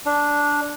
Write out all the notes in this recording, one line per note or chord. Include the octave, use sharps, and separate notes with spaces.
D4